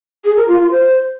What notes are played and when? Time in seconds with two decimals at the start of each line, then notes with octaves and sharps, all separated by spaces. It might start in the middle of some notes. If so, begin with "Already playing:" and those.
0.25 G#4
0.36 A#4
0.48 F4
0.60 F4
0.71 C5